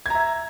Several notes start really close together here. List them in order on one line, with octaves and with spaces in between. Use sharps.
G#6 A#5 E5